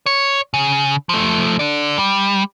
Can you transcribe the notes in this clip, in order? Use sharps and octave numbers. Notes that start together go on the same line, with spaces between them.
C#5
C#3
F3 A3
D3 D5
G3